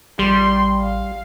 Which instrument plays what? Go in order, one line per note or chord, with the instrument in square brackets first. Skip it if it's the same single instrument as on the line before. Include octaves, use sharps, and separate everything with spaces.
[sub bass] A1 [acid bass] G3 [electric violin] C6
[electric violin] F5